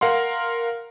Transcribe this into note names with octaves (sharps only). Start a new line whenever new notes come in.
A#4 F5 F#5 C6